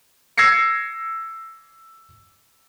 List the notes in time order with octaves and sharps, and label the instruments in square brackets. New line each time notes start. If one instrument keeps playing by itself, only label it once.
[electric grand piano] E6 G#6 A#6 C7 C#7